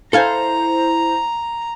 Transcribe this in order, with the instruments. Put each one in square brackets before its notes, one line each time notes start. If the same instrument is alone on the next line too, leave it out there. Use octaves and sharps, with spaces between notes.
[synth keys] E4 C5 [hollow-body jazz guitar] A4 F5 G#5 [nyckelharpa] A#5